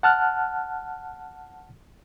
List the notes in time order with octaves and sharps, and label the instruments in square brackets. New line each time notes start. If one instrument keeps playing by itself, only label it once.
[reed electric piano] F#5 A5 F6 F#6